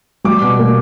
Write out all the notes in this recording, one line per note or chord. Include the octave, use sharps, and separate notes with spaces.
G3 D6
B2
A#3